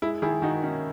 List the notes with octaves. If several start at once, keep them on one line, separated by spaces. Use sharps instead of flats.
G#3 E4
D#3 E4 G#4
D#3 D#4 F#4
C#4 D#4